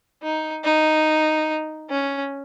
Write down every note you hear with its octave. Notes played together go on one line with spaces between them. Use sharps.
D#4
D#4
C#4